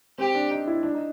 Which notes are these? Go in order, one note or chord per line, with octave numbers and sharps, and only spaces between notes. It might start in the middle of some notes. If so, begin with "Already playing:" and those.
C4 G4
D4
D#4
E4
D4
D#4